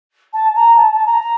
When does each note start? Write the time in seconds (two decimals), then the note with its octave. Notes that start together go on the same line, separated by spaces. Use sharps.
0.33 A5
0.55 A#5
0.77 A5
0.92 A5
1.06 A#5